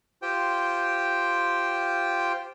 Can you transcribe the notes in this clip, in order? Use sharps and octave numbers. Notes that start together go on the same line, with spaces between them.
F4 G4 C5 G5